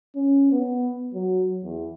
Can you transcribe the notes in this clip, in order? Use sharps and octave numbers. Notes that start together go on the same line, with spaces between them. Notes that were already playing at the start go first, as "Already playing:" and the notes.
C#4
B3
F#3
E2